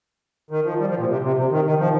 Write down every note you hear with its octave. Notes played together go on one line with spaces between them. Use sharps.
D#3
F3
G3
F3
A#2
C3
C3
C3
D#3
D#3
F3